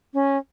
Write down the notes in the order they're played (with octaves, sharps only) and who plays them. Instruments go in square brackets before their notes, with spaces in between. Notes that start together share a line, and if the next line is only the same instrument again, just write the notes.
[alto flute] C#4